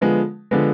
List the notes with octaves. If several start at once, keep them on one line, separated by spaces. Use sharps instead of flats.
D3 F3 G#3 B3
D3 F3 G#3 B3